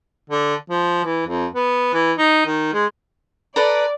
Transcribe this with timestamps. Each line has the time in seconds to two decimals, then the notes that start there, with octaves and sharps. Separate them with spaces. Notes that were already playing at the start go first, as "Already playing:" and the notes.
0.30 D3
0.70 F3
1.05 E3
1.27 F2
1.55 B3
1.94 E3
2.18 D#4
2.46 D#3
2.74 G#3
3.56 A4 B4 D5 A#5